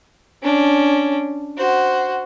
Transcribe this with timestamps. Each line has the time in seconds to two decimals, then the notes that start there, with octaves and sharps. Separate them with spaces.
0.43 C#4 D4
1.57 F#4 C5